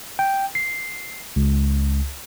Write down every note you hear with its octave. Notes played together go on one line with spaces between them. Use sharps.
G5
C7
C#2